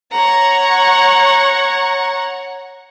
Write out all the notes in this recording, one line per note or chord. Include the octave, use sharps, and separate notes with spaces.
C#5 F#5 A#5